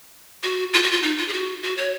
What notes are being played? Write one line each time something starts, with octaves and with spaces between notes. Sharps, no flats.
F#4
F4
F#4
F4
D#4
F4
G#4
F#4
F#4
C#5